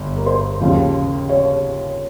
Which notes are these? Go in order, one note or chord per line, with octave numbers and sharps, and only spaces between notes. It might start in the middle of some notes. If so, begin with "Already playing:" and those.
Already playing: G1 G2
A#4
C5
D#2 C#3 F3
C#5